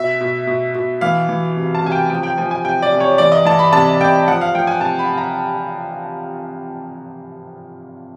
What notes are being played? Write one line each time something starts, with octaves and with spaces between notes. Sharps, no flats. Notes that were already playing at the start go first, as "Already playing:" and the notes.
Already playing: B2 E5
B2
B2
B2
E3 F5
E3
C3
A5
C3 G#5
G5
F3 G5
G5
F3 G#5
G#5
C3 G5
D5
C3
C#5
E3 D5
D#5
E3 A5
B5
C3 A5
C3 G5
F3 F#5
F5
F3 G5
G#5
C3 A5
B5
C3
A#5